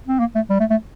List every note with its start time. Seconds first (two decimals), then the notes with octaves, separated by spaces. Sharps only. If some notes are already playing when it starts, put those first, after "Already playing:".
0.08 C4
0.19 A#3
0.35 A3
0.50 G3
0.60 A3
0.70 A3